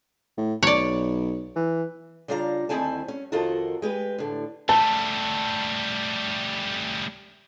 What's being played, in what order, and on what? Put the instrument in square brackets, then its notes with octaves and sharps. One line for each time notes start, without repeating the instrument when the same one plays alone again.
[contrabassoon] A2
[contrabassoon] B1 [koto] C#5 D5
[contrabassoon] E3
[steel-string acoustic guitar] C#3 G3 D4 F4 D#5 A#5
D2 D#3 C4 E4 G#5 A5
C#4
F2 D#3 F4 F#4 A4 A#4
G#3 G4 B4
A2 D3
[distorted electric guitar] G3 A3 [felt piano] A5